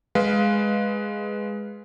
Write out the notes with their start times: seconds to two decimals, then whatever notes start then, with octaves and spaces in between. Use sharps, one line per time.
0.15 G#3 B4 F5